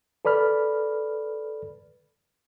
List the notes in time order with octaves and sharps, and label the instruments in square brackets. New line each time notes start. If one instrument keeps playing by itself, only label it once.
[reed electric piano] A4 B4 D5 B5 F6